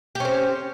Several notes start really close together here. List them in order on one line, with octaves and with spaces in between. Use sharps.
G4 C#4 C4